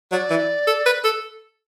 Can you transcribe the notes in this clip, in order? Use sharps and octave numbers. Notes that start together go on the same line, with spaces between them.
F#3 D5
E3
A4
B4
A4